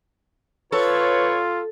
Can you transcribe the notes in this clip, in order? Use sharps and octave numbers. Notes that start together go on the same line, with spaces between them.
F4 A4 B4 C#5